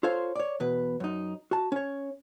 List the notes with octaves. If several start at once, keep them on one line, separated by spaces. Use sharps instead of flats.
F4 A4 C5 C#5 F5
C#5 D5
E2 B2 B4
F#2 D#4
F#4 A5
C#4 C#5